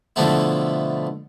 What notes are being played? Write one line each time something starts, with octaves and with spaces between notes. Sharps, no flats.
B2 D3 F3 A3 B3 E4